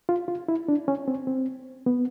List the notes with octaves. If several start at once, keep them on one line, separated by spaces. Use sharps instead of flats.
F4
F4
E4
D4
C#4
C4
C4
B3